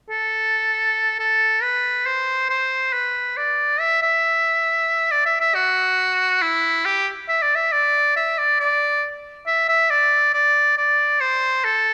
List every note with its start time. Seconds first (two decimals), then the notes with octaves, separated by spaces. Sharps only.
0.10 A4
1.19 A4
1.62 B4
2.06 C5
2.50 C5
2.93 B4
3.37 D5
3.80 E5
4.03 E5
5.11 D5
5.26 E5
5.41 E5
5.55 F#4
6.42 E4
6.86 G4
7.29 E5
7.42 D5
7.55 E5
7.72 D5
8.17 E5
8.38 D5
8.60 D5
9.47 E5
9.68 E5
9.90 D5
10.34 D5
10.77 D5
11.21 C5
11.64 A4